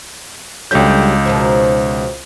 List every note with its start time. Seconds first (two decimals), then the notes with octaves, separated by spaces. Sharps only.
0.71 C#2 D3 F#3 G3 G6
1.25 B2 D#3 F3